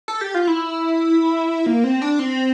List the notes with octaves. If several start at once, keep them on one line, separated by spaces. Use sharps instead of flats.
A4
G4
F4
E4
A#3
C4
D4
C4